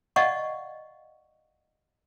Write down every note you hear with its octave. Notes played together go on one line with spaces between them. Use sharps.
D5 D#5 F5 F#5 A5 C#6